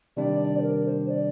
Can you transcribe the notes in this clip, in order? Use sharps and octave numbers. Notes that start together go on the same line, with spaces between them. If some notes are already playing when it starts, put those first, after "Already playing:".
C3 D#3 G3 D4 D5
D5
C5
A#4
C5
D5